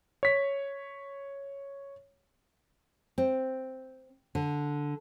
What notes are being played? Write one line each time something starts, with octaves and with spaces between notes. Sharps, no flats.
C#5 B6
C4
D3